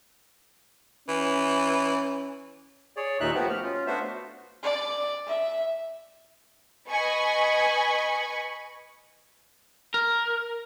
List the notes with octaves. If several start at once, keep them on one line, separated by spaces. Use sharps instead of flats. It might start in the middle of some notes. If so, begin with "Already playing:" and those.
E3 C#4
G#4 C#5 D5
D#2 A#2 D#4 E5 F#6
F3 A3 B3 F#4 G4
F6
C#4 F4
A3 B3 D4 F#4 C5 E5
D5
E5
B4 D#5 G#5 B5 C#6
A#4